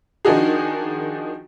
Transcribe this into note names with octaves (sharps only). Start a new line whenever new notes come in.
D#3 F3 D4 D#4 F#4 G#4